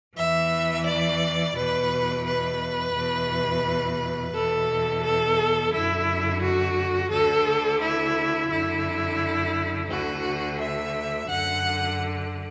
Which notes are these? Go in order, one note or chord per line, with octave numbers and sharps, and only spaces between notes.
E2 E3 E5
D5
E2 B2 B4
B4
E2 B2
E2 B2 A4
A4
F#2 D3 E4
F#4
D2 D3 A4
E4
F#2 D3 E4
D2 D3 F#4
E5
F#2 D3 F#5